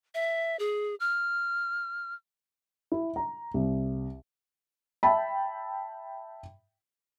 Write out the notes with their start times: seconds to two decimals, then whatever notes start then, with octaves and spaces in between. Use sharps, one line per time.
0.15 E5
0.59 G#4
1.00 F6
2.92 E4
3.16 A#5
3.54 C2
5.03 E5 G5 A5 B5